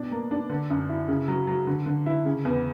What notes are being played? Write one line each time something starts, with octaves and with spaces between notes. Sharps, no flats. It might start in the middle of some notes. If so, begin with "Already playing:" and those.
Already playing: B2 D4
A#3
D4
D3
F#2
E4
C#3
F#3
F#3
D3
D3
E4
C#3
E2